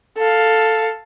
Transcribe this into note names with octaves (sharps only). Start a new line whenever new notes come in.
A4 F5